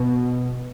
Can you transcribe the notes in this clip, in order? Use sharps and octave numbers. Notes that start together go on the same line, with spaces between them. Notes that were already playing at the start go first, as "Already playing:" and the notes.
Already playing: B2